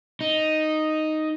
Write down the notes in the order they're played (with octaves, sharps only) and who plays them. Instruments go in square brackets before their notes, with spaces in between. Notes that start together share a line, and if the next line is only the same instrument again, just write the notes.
[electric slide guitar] D#4